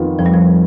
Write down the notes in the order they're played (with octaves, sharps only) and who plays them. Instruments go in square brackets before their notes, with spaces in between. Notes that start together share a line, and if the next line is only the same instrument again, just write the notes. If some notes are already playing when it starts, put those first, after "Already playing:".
Already playing: [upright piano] F2 D#3 B3 F4
[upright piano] F2 [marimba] F3
[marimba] G3
F3